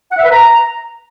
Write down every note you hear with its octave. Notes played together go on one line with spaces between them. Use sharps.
F#5
E5
B4
A#5